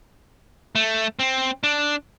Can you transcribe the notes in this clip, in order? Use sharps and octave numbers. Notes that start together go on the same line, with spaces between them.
A3
C4
D4